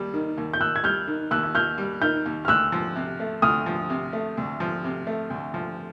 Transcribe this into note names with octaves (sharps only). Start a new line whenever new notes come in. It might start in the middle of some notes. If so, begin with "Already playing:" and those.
Already playing: D#2 G3
D#3
D#2
G6
D#2 E6 F#6
G#6
G3 F6 G6
D#3
D#2 E6 F#6
F#6
D#2 F6 G6
G3
D#3 F6 G6
D#2
F6
D2 E6 F#6
F3
C3
A3
D2 D#6 F6
F3
C3
A3
D2
F3
C3
A3
D2
F3